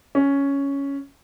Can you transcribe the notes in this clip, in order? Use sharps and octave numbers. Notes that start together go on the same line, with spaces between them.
C#4